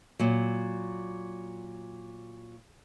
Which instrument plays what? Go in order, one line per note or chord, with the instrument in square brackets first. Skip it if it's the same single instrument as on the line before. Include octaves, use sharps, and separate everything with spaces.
[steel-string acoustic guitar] A#2 F#3